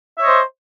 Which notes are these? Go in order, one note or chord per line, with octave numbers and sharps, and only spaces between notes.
C5 C#5 D#5 E5